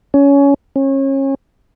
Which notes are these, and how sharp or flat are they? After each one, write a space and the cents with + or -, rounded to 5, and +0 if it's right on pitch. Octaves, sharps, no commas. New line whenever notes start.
C#4 +20
C#4 -30